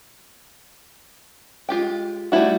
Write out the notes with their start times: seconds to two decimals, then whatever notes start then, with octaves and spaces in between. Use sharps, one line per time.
1.69 G#3 F4 G4 G5
2.32 G3 A3 B3 E4 F#4